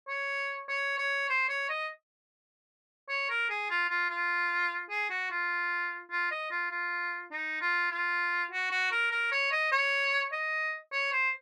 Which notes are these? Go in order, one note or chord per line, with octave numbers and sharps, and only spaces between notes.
C#5
C#5
C#5
C5
C#5
D#5
C#5
A#4
G#4
F4
F4
F4
G#4
F#4
F4
F4
D#5
F4
F4
D#4
F4
F4
F#4
F#4
A#4
A#4
C#5
D#5
C#5
D#5
C#5
C5